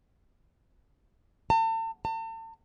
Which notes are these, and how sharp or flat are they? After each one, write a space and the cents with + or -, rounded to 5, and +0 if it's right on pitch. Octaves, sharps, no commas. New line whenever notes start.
A5 +40
A5 +40